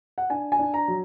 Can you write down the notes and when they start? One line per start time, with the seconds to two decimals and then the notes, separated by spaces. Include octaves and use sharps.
0.18 F#5
0.30 D4 G#5
0.52 G#5
0.59 D4
0.74 A#5
0.88 F#3